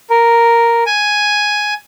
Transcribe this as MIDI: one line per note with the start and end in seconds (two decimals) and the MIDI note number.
0.10 0.84 70
0.86 1.74 80